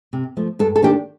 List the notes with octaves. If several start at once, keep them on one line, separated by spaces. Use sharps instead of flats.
C3
F3 A3
G2 A4
A4
D#3 A#3 D4 G4